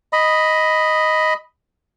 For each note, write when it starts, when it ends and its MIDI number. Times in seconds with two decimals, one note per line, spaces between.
0.13 1.34 75
0.13 1.34 83